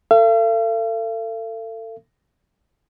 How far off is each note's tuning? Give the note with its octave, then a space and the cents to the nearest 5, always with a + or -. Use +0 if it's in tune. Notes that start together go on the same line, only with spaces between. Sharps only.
A4 +30 F5 -45